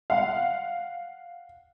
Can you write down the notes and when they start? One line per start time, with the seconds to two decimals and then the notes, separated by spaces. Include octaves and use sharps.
0.10 F5 F#5